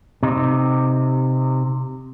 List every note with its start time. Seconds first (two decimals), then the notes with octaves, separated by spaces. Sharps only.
0.23 C3 D#4